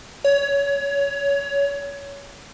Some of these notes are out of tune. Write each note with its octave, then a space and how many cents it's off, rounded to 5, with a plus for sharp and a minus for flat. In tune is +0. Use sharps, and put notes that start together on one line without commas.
C#5 +20